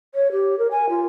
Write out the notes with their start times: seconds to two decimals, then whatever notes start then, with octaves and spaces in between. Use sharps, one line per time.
0.15 C#5
0.32 G4
0.59 A#4
0.71 G#5
0.89 F4